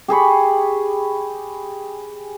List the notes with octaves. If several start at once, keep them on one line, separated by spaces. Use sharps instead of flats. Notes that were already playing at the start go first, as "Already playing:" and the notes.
G4 G#4 B5 C#6